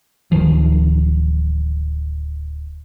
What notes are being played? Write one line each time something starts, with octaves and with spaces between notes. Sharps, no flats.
D1 C2 D#3 F3